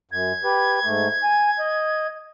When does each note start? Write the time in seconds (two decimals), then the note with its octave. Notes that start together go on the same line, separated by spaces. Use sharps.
0.11 F#2 G#6
0.44 G4 B4
0.85 G#2 A3
1.23 G#5
1.59 D#5